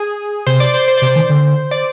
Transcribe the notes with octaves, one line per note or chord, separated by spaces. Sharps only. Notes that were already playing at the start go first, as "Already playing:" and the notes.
Already playing: G#4
C3 C5
D5
C5
C5
C3 D5
C5
D#3
D3
D5